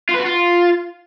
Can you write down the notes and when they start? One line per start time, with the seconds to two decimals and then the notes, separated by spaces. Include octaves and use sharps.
0.09 F4
0.14 B4
0.20 F#4
0.25 F4